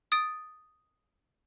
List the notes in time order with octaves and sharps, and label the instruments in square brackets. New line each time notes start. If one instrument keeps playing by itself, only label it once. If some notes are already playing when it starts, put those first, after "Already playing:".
[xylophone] D#6 A6 D7